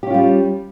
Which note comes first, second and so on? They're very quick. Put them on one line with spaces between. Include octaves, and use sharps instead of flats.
G4 C#4 F4 G3